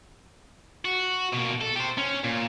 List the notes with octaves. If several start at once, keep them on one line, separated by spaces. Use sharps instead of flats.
F#4
B2 A#3
A4
G4 C5
C#4
A#2